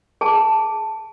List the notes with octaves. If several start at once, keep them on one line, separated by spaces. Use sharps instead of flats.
G#4 A5